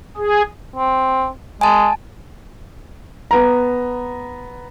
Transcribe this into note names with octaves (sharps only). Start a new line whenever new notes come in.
G#4
C4
G#3 G#5 A5
B3 A#5